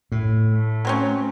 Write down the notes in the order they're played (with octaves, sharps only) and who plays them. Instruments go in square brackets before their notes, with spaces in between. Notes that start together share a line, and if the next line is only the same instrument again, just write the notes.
[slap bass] A2
[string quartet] A3
[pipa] F#3 C4 C#4